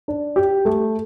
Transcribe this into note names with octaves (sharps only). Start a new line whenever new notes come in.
D4
G4
A3